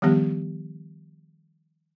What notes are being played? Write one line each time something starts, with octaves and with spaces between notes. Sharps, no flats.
D#3 F3 G3 B3 G4